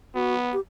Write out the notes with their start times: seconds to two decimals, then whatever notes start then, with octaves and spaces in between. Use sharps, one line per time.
0.15 B3 F#4
0.53 G4